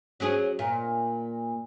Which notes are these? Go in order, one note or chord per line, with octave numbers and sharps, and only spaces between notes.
F#3 C#4 G#4
A#2